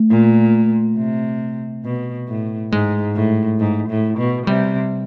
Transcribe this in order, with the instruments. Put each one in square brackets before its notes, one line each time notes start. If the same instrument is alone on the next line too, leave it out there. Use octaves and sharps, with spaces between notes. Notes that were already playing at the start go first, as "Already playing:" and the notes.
Already playing: [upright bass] A3
[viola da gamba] A#2
C3
B2
A2
[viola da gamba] G#2 [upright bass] G#3
[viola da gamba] A2
G#2
A2
B2
[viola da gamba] C3 [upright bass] G3